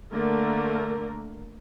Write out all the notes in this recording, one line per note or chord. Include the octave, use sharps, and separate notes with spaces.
D3 A3 A#3 A#4